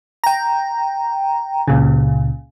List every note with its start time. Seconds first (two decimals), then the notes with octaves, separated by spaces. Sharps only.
0.24 G5 A#5
1.68 C#2 A#2 C#3